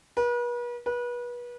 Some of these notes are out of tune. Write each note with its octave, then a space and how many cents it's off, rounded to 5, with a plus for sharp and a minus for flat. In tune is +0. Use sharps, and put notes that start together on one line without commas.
B4 -40
B4 -30